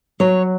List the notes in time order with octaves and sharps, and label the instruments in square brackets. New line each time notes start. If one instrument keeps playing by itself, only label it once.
[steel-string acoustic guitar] F#3 C#5